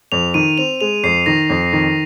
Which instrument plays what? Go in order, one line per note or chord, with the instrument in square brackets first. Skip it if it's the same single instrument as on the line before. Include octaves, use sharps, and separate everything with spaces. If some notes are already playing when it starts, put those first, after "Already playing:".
[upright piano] F2 [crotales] F7
[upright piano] D#3 [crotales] D#7
[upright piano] C4 [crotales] F7
[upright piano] G#3 [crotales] F7
[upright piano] F2 [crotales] C7
[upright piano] D#3 [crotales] A#6
[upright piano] F2
D#3